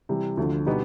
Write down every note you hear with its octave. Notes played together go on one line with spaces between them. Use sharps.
C3 E3 G3
D2 D3 F3
B2 G3 B3 D#4 G4